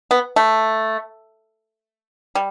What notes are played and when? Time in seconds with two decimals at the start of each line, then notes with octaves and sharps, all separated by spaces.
0.11 B3
0.36 A3
2.35 G3